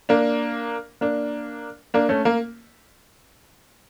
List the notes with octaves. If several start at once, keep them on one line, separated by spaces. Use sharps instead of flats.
A#3 D4
A#3 D4
A#3 D4
A3 C#4
A#3